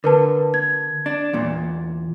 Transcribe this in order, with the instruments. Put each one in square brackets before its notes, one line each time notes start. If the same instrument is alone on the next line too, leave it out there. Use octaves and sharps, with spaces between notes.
[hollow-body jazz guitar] D3 [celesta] A#4 B4 A5
[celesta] G#6
[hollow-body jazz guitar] D4
E2 A#2